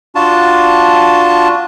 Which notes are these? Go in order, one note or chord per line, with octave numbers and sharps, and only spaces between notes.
D4 F4 F#4 A5